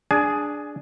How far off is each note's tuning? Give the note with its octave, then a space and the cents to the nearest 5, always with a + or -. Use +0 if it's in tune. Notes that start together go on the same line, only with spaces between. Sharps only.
D4 +0 G#4 +0 G#5 +25